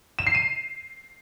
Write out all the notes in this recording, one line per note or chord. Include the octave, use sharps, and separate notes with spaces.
E7
C7
D#7